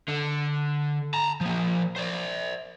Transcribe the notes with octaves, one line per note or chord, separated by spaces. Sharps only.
D3
A5 A#5
F3 A#3
C5 D5